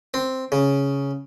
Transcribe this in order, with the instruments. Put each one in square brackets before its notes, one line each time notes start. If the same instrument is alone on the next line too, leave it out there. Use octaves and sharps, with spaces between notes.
[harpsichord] C4
C#3